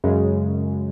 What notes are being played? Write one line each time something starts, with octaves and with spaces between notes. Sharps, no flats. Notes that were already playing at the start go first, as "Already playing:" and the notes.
F#2 C#3 G#3